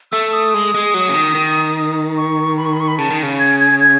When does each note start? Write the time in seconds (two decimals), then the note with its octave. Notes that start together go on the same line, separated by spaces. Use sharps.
0.12 A3 E6
0.33 D#6
0.54 G#3
0.74 G#3
0.94 F#3
1.09 C#3
1.14 D#3
1.35 D#3
2.17 C#6
2.57 B5
2.65 C#6
2.73 B5
2.80 C#6
2.88 B5
2.98 C#3 A5
3.10 D#3
3.23 C#3
3.40 G#6
3.60 G#6
3.80 G#6